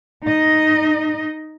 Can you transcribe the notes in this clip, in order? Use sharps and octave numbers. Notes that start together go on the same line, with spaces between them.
D#4 D#5